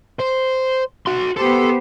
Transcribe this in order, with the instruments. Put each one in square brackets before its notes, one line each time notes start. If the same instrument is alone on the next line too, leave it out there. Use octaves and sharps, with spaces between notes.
[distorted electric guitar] C5
F#4 C6
[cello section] B3 G4 C5 [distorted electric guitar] A4